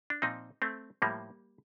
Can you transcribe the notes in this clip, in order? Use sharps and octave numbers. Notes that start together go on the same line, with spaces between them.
D4
A#2 F3 C4 D#4
A3 C4
A2 F3 G3 A#3